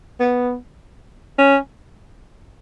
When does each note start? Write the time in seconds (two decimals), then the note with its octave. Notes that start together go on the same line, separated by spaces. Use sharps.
0.20 B3
1.38 C#4